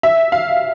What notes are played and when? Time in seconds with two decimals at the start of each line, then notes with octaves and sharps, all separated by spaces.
0.03 E5
0.32 F5